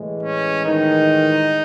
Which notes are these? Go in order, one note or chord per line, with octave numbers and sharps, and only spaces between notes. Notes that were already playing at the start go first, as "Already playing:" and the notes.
Already playing: A2 E3 G#3
C#4
D#3 D#4